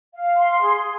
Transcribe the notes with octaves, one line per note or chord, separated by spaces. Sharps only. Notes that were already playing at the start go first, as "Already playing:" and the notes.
F5
C6
G#4